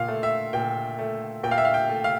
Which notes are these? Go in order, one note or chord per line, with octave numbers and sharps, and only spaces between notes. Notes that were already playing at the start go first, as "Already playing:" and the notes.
Already playing: A#2 F5
A3
E5
A#2 G5
A3
A#2 G5
F5
E5
F5
G5
A3
F5